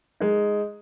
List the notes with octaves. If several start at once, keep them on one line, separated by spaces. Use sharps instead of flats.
G#3 D#4